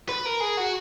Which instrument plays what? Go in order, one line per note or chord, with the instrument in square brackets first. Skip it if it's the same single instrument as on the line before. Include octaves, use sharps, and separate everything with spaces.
[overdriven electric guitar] B4
A#4
G#4
F#4